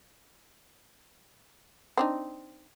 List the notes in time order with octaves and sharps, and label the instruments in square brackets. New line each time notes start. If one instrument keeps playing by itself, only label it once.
[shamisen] C4 D4 D#4